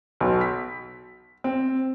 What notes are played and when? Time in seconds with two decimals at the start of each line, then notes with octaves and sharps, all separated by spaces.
0.20 B1
0.41 B6
1.44 C4